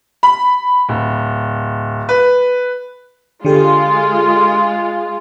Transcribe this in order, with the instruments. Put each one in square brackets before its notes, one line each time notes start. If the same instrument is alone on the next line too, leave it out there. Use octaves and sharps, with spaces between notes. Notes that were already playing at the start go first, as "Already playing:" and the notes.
[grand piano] B5
D1
B4
[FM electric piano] D3 G4 A4 [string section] G#3 F4